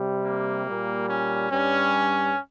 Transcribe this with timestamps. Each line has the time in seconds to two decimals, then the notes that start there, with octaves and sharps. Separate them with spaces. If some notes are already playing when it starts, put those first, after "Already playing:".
Already playing: C3 G3
0.25 A#3
0.67 A#2 G3
1.09 C#4
1.50 G2 G3 C#4